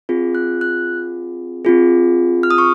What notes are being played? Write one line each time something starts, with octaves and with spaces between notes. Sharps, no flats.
C4 F4 G#4
F#6
F#6
C4 F4 G#4
F6
D#6
C#6